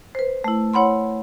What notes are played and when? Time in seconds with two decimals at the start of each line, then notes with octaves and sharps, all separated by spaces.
0.15 B4 C5
0.44 A3 E4
0.74 E4 C#5 F#5 B5 C6